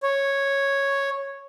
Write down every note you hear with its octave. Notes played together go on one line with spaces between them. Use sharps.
C#5